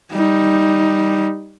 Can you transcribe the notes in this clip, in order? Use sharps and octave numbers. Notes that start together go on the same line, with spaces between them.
G3 D#4